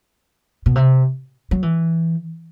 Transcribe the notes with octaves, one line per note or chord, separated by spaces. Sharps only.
B2
C3
F#3
E3